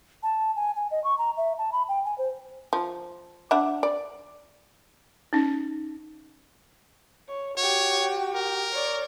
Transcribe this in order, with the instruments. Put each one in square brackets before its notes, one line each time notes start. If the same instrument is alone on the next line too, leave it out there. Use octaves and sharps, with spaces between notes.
[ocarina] A5
G#5
G#5
D#5
C#6
A#5
E5
A5
B5
G5
G#5
C5
[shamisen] F3
D4 E5 F#5
D5
[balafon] C#4 D#4
[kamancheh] C#5
[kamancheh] F#4 G4 [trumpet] C#5
[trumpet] A#4
[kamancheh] C#5 D5